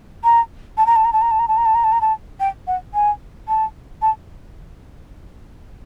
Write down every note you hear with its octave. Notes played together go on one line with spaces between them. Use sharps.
A#5
A5
A#5
A5
A#5
A5
A#5
A5
A#5
A5
A#5
A5
A#5
A5
A#5
A5
G5
F#5
G#5
A5
A5